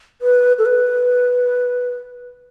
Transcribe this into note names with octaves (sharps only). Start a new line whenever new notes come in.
B4
A4
B4